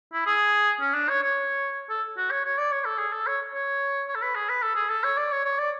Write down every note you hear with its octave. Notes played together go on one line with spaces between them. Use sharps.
E4
G#4
C#4
D4
C#5
C#5
A4
F#4
C#5
C#5
D5
C#5
A4
G#4
A4
C#5
C#5
C#5
A4
B4
G#4
B4
A4
G#4
A4
C#5
D5
C#5
C#5
D5